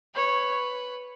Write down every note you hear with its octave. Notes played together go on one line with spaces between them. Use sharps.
B4 C#5